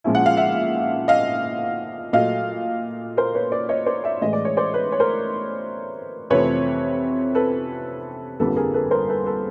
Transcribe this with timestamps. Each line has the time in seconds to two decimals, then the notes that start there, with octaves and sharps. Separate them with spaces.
0.04 A#2 F3 G#3 C#4 E4
0.15 F#5
0.26 F5
0.37 E5 F#5
1.08 D#5 F5
2.13 A#2 F#3 A3 D#5 F5
3.17 A#4 C5
3.35 B4 C#5
3.52 C5 D5
3.69 C#5 D#5
3.86 C5 D5
4.04 D5 E5
4.22 A2 E3 G#3 D#5
4.33 D5
4.45 C#5
4.57 C5 D5
4.74 B4 C#5
4.92 C#5
5.00 A#4 C5
6.30 F2 C3 E3 A3 C4 B4 C#5
7.35 A4 B4
8.40 G1 F2 D3 G3 A#3 A4 B4
8.56 G#4 A#4
8.74 A4 B4
8.91 A#4 C5
9.09 A4 B4
9.26 A4 B4